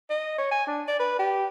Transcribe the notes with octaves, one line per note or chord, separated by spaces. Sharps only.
D#5
C#5
G#5
D4
D5
B4
G4